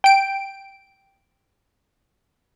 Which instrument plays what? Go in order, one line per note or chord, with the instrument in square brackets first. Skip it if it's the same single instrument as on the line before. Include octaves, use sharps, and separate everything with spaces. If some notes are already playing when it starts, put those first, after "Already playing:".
[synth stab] G5 D7